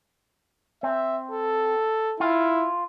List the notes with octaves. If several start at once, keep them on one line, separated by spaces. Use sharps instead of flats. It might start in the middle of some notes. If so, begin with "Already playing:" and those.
C4 E5
A4
E4 F4